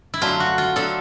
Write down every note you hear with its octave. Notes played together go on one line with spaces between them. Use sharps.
E4
F#2 D3 F#3 A3 D4 F4
F#4
F4
D3 F#3 A3 D4 A4